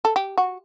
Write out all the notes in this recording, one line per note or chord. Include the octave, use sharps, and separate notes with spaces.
A4
G4
F#4